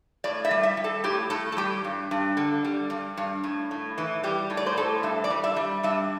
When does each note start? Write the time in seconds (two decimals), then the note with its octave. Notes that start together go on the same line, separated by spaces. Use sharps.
0.24 A2 D5
0.45 E5
0.51 G3
0.63 E5
0.77 G3
0.84 A4
1.04 A2 G4
1.30 A2 A4
1.52 A4
1.57 G3 G4
1.85 G2
2.11 G2
2.37 D3
2.64 G3
2.90 G2
3.17 G2
3.44 A2
3.71 A2
3.98 E3
4.23 G3 G4
4.50 A2
4.57 D5
4.66 C5
4.77 A2 A4
5.03 G2 E5
5.24 D5
5.30 G3
5.44 E5
5.56 G3
5.83 G2 E5